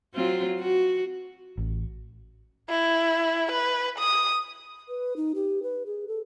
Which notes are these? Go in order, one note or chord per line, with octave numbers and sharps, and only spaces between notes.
F#3 C4 F4
F#4
A1
E4
B4
D#6
B4
D#4
G4
B4
G#4
A4